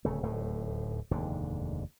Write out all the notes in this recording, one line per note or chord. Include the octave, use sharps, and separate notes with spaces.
D1 C#3 A3
D1 D#2 A2 A3
F1 D#2 G#2 D3